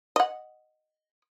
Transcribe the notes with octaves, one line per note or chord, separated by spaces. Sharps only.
D#5 F#5